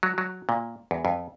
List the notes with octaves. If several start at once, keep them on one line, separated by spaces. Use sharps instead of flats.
F#3
F#3
A#2
E2
F2